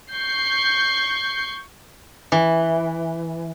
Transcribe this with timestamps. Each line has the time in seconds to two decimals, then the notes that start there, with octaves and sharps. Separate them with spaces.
0.12 C#6 G6 C7
2.32 E3